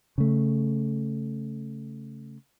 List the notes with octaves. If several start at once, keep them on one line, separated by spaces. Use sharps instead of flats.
C#3 A3